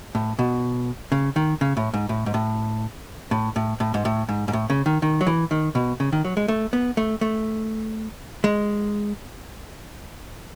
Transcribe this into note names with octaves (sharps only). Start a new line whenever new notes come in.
A2
B2
C#3
D#3
C#3
A2
G#2
A2
G#2
A2
A2
A2
A2
G#2
A2
G#2
G#2
A2
C#3
D#3
D#3
F#3
E3
D#3
B2
C#3
D#3
F#3
G#3
A3
B3
A3
A3
G#3